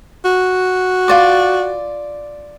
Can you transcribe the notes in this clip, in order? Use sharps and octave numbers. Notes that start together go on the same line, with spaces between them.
F#4
F4 D5 D6